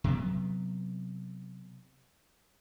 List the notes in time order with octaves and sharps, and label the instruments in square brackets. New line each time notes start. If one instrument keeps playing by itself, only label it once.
[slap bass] C3 F#3 B3